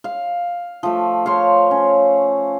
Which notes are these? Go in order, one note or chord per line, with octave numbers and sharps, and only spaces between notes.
F5
F3 A3
C5 C#5 F5
C#4